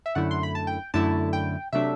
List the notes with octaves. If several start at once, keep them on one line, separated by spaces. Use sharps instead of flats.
E5
F#2 D3 A3 E4 F#5
C6
B5
A5
G5
F#2 D3 A3 E4 A5
G5
C3 F#3 A3 D4 E5